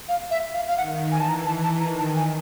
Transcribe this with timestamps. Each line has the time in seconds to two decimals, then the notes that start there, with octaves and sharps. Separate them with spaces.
0.08 F5
0.31 E5
0.54 F5
0.67 F5
0.78 D#3 F#5
1.12 E3 G#5
1.20 A5
1.29 A#5
1.46 E3 A5
1.63 A5
1.80 D#3 A#5
1.98 A5
2.16 G#5